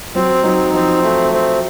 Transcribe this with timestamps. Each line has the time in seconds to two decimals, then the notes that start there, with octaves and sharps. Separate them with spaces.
0.15 F#3 C4
0.44 F#3 D#4
0.73 F3 C4
1.04 A3
1.33 C4